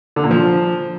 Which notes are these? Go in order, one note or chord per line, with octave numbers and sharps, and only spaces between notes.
D3
A#2
F3